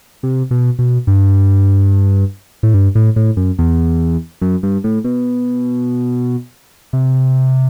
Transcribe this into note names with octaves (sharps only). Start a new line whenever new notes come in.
C3
B2
B2
G2
A2
G2
A2
A2
F#2
E2
F#2
G2
A2
B2
C3